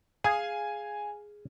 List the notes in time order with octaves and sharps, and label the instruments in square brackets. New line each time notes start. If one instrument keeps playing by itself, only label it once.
[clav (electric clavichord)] G#4 [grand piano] F5 G#5